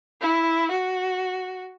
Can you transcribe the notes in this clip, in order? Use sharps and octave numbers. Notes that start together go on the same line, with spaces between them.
E4
F#4